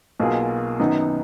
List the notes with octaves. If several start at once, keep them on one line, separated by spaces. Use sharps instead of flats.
B1 B2 A#3 F4 G#4
F#2 D#3 F#3 B3 D#4